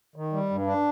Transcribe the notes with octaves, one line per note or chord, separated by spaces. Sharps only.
D#3
G3
G2
D4